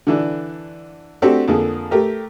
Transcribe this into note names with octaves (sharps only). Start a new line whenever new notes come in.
D3 E3 D4
A3 C4 D4 F#4 G4 A4
F2 D3 A#3 G#4
A3 G4 A#4